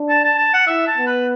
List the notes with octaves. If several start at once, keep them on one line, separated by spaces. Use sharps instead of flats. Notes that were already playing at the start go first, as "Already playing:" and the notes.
Already playing: D4
A5
A5
A5
F#5
E4 E5
A5
B3
B4